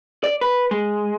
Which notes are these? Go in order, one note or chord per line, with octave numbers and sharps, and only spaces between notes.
D5
B4
G#3